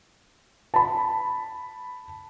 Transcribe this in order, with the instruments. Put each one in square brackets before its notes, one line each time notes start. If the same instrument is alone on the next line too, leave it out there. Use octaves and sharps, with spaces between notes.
[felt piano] A5 B5